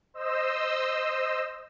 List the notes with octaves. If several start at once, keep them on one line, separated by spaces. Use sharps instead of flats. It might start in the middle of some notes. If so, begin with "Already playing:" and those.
C5 D#5 E6